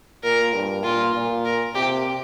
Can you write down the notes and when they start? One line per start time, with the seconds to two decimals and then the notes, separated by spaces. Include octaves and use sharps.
0.24 A#2 A#4
0.54 G2
0.84 A#2 F4
1.14 A#2
1.45 A#4
1.75 C3 G4